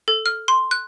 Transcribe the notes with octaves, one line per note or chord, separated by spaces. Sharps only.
A4
F6
C6
F#6